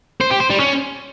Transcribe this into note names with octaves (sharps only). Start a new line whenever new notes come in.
C5
G4
C5
G3
C#4